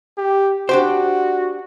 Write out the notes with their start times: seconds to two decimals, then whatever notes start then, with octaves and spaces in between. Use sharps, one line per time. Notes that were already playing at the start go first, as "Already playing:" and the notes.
0.18 G4
0.69 D4 F#4 G4 C5